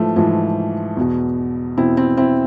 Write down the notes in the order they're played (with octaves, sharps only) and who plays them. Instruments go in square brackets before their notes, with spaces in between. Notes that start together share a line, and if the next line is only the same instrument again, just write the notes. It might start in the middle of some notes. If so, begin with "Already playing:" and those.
Already playing: [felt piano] G#2 E3 F3 A3
G#2 E3 F3
E2 B2
E2 B2 C4 E4
C4 E4
C4 E4